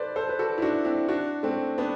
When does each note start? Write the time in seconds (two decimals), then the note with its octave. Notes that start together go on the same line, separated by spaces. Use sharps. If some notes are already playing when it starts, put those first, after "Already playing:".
Already playing: A4 B4 C5 D5
0.16 A4 C5
0.29 B4
0.39 F#4 A4
0.58 E4
0.62 D4 F#4
0.85 C4 E4
1.08 D4 F#4
1.43 A3 C4
1.78 B3 D4